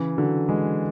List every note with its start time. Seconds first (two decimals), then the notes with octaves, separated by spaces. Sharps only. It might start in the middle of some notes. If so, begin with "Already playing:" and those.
Already playing: C#3 E3
0.17 D3 F#3
0.49 E3 G#3